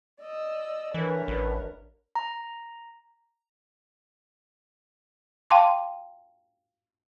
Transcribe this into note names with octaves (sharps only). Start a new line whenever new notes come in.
D5 D#5 E6
D3 E3 A#4 B4 C#5
A1
A#5
F5 G5 A5 C6 D6